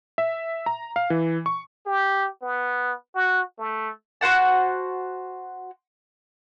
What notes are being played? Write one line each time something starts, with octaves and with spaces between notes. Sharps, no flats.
E5
A#5
F5
E3
C#6
G4
B3
F#4
A3
F#4 C5 F#5 A5